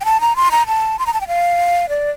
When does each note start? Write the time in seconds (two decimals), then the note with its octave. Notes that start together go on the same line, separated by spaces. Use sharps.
0.01 G5
0.05 A5
0.21 A#5
0.36 C6
0.51 A#5
0.67 A5
0.99 C6
1.06 A#5
1.13 A5
1.21 G5
1.28 F5
1.89 D5